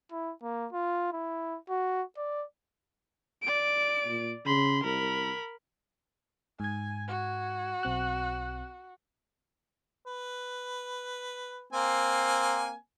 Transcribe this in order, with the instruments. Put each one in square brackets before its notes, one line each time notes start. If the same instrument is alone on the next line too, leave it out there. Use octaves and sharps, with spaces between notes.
[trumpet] E4
A#3
F4
E4
F#4
D5
[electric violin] D5 D7
[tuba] A#2
[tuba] C#3 [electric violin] B5 C6
[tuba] C2 [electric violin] A#4 B5
[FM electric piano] G#2 G#6 [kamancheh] G#5
[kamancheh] F#4
[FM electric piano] B1 C4 F#6
[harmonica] B4
A#3 C4 G#5